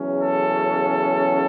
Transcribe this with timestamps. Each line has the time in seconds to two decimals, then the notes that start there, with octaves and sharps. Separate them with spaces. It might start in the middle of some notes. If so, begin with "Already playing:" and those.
Already playing: E2 C#3 F#3 C#4
0.20 A4